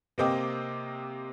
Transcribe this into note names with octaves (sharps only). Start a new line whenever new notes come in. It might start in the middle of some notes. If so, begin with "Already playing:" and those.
C3 A#3 C4 D#5 G5 D6